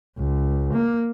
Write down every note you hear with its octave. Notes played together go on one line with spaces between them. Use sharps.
C#2
A#3